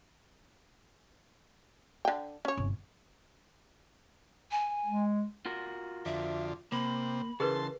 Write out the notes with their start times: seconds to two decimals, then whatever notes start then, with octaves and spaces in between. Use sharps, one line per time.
2.05 D3 G5
2.45 C#4 C#5
2.57 G1 C3
4.51 G#5
4.85 G#3
5.46 F4 F#4 A#4
6.06 F2 D3 E5
6.72 C3 A#3 B5
7.40 C#3 E3 G#4 A#4 B4 A5 C6